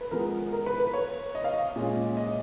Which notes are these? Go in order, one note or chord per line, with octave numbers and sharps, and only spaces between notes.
B4
F3 G#3 B3 A#4
A#4
B4
B4
C#5
D#5
F5
D#5
A#2 G#3 C#4
D#5